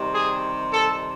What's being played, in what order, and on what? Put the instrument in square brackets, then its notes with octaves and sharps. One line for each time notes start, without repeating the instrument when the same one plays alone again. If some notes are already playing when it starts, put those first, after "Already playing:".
Already playing: [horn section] C3 D#3 G3
G#4
A4